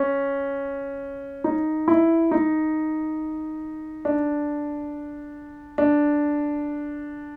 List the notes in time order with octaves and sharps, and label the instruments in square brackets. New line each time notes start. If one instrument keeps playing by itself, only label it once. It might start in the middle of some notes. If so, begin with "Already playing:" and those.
Already playing: [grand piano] C#4
D#4
E4
D#4
D4
D4